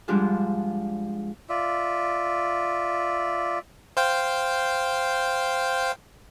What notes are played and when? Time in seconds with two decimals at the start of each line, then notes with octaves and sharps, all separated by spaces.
0.08 G#2 F3 G3 G#3 D4 F4
1.49 F4 D5 E5
3.97 C5 F5 G5